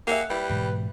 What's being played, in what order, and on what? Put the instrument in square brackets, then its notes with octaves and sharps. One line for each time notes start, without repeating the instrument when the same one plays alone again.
[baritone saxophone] A#3 [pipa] G4 G#4 E5 [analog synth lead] F#5
[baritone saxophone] G3 [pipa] E4 [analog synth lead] B4
[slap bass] G#2 B2 E3